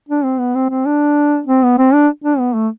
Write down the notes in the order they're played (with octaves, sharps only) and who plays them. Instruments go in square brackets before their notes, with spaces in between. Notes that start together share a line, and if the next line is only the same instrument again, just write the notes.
[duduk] D4
C4
B3
C4
C4
D4
C4
B3
C4
D4
D4
B3
A3